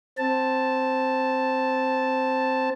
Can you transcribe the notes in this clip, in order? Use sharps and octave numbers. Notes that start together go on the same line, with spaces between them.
C4 A5